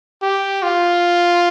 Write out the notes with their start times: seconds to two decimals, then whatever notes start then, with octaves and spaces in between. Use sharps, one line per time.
0.22 G4
0.63 F4